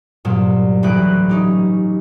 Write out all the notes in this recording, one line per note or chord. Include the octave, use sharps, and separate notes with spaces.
C2 G2 A#2 F#3
A1 D2 F#3 B4 F#6 D7
C#4 D#4 G4